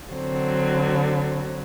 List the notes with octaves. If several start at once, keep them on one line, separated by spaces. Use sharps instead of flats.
D3 F#3 C4